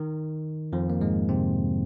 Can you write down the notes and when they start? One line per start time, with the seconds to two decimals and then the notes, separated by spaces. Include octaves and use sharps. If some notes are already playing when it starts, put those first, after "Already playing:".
Already playing: D#3
0.73 F2 F3
0.90 A#3
1.01 G#2 G#3
1.29 C3 C4